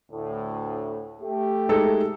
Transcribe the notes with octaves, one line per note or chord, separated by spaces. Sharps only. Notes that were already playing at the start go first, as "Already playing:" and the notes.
D2 A2
A3 G4
G#3 D#4 A4